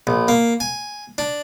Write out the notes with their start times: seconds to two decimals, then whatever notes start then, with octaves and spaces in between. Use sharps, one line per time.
0.07 A#1
0.28 A#3
0.60 G#5
1.18 D4